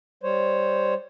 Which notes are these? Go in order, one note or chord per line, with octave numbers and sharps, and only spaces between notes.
G3 C5 C#5